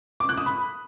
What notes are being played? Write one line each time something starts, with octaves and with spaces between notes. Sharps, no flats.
D6
F#6
D#6
B5